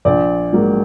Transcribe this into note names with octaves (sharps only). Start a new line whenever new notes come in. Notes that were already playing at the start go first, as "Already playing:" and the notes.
A#1 D5
G#2 F#3 A#3